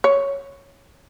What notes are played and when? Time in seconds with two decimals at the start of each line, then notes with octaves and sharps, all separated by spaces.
0.04 C#5